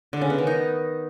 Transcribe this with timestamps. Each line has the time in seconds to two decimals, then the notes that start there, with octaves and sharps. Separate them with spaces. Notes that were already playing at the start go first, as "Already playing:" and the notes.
0.13 D3
0.21 C#3
0.30 B3
0.38 D#3
0.47 D#4